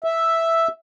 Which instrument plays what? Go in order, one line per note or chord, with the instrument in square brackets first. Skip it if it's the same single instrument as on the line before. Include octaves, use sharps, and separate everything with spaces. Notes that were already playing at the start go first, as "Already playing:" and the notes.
[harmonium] E5